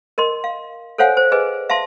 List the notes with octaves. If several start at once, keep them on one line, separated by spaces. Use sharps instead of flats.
A#4 D#5 C6
F5
A4 C5 C#5 F5 F#5 G#5
C5
G#4 B4 D#5 G#5
E5 F5 A5 C6